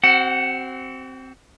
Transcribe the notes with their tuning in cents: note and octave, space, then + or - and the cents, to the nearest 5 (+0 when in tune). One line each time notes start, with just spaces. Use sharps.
C4 +0 F#4 +40 F#5 +0